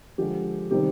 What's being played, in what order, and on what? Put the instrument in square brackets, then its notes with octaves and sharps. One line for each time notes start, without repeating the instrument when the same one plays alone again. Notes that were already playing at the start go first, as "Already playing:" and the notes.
[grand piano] D3 F3 G#3 G4
C3 D#3 G3 C4 G4